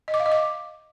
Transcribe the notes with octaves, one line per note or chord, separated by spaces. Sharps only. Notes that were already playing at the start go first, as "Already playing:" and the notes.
D#5
D6
F5
D#5
D6